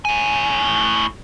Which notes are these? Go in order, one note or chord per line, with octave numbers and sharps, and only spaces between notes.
A2 G#5